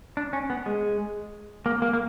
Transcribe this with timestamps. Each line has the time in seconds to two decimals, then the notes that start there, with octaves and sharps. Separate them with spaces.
0.17 D4
0.33 C#4
0.50 B3
0.66 G#3
1.66 A#3
1.82 A#3
1.93 A#3